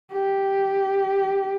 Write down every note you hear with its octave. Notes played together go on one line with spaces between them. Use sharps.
G4